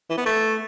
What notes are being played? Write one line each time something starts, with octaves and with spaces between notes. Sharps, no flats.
E3
B3
A3